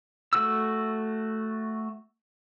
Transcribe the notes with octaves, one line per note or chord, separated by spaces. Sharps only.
A3 F#4 E6